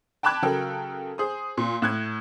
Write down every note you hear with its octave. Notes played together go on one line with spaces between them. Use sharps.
G5 A5 B5 D6 F#6 G#6
C#3 F#3 A4 A#4 G5
G#4 C5 D#6
A#2
A2 F#6 G#6